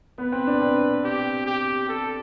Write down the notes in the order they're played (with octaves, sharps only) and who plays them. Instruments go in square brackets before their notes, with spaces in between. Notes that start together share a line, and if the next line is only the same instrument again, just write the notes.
[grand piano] B3 [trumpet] B4
[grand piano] C4
D4
C4
[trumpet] G4
G4
A4